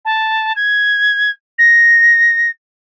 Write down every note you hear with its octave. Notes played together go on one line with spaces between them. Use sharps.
A5
G#6
A#6